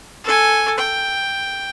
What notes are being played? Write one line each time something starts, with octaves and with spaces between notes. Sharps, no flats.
A4 G#5
G5